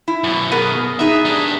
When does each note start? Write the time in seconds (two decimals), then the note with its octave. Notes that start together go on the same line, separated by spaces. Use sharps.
0.08 E4
0.24 F#2 B2
0.52 B3 G#4 A#4
0.99 B3 D#4 G#4 E5
1.25 G3 D4